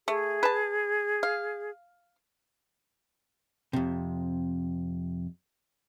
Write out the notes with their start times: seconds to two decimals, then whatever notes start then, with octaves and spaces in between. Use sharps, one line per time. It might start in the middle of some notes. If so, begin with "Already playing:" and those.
0.08 A3 G#4
0.43 B4 A5
1.23 F5
3.73 F2 C3